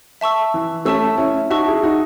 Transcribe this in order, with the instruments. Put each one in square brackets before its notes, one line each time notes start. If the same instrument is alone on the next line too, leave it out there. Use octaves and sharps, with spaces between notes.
[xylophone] E5 A5 C#6 E6
[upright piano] E3
[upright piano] A3 C#4 [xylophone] E5 A5 C#6 E6
[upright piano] C#4 E4
[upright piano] D#4 F#4 [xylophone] E5 A5 C#6 E6
[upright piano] E4 G#4
D#4 F#4